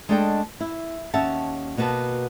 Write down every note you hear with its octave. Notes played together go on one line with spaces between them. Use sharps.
G#3 A3 D4 A4 D#5 G5
E4
D#2 C#4 C#5 E5 F#5 A5
B2 A#3 B3 F#4 B4 A5